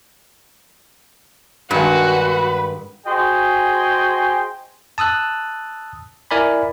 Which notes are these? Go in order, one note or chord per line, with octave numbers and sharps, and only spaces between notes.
G2 D#3 G#3 F#4 B4
F#4 G#4 C5 D#5 G5 G#5
A5 D#6 E6 F#6
E4 A#4 D5 G#5 B5